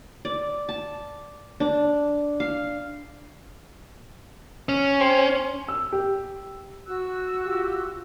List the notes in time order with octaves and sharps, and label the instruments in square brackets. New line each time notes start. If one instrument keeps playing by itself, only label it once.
[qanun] D5
A5
D4
F5
[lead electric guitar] C#4
[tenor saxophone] C4
[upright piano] E6
G4
[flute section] F#4 E6 F#6
[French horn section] F4 G4